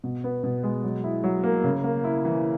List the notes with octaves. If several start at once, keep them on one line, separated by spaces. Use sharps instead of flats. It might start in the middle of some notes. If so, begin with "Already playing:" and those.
B2
B3
B2
G#3
F#3
E4
F#3
A#3
C#3
A#3
E4
E3